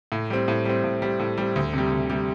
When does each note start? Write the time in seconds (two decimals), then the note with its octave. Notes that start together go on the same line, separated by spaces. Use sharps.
0.12 A2
0.30 G3 C4
0.48 A2
0.65 G3 C4
0.84 A2
1.02 G3 C4
1.19 A2
1.38 G3 C4
1.56 D2
1.73 C3 G3
1.91 D2
2.10 C3 G3